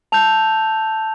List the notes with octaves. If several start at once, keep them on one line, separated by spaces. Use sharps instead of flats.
A5 E6 G6 F7